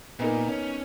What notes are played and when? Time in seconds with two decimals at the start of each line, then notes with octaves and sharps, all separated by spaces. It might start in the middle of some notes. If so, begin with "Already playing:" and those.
0.19 A#2 B3 D#4 A#4
0.49 C#4